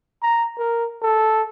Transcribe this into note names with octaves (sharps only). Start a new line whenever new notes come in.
A#5
A#4
A4